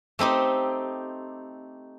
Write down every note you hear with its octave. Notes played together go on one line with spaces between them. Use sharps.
A3 C4 D#4 G4